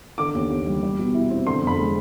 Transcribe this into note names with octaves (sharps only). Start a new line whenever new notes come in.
D3 D6
D#2
D#2
G3
G3
B2
E4
C4
D3 C6
F2
B5
G#3